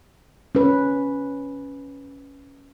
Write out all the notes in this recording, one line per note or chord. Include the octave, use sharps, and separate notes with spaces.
C#4 B4